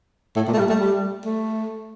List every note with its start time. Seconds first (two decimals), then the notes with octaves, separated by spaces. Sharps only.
0.36 A2
0.48 A#2
0.54 A3
0.59 G3
0.69 A3
0.81 G3
1.25 A3